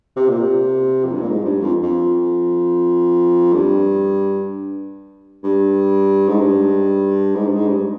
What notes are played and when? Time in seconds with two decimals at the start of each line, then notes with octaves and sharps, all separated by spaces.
0.16 C3
0.29 A#2
0.41 C3
1.05 F2
1.12 G2
1.21 A#2
1.29 G#2
1.45 G2
1.61 F2
1.83 F2
3.53 G2
5.44 G2
6.29 G#2
6.41 G2
7.36 G#2
7.48 G2
7.53 G#2
7.69 G2